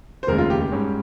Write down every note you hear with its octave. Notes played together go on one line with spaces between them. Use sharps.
C5
F1 D#2 C#3 G#3 A#4
F4
G4
G4
G#2 G3 C#4